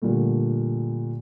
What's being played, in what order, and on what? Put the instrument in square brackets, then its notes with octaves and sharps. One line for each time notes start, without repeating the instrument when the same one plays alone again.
[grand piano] A#2 D3 G3 A3